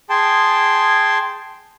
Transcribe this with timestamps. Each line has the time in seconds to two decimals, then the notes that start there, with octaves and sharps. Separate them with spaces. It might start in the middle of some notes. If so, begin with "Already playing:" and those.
0.10 G#4 G5 A5 C6